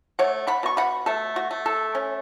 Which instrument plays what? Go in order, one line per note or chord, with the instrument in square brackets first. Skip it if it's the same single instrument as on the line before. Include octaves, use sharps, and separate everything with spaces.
[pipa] A3 C#5 F#5
F#5 B5
B2 C#6
F#5 B5
A3 A4
F#4
A3
A4
C#4